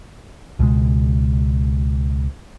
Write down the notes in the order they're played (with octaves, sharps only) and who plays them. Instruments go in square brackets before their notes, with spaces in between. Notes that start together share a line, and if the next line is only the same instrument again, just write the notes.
[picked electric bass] C#2 B2 G#3